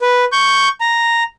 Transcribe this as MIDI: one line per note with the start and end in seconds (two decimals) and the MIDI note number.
0.02 0.25 71
0.32 0.68 85
0.32 0.68 91
0.81 1.24 82